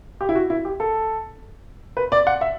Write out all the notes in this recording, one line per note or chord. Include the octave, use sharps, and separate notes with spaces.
G4
E4
F#4
E4
G4
A4
B4
D5
F#5
E5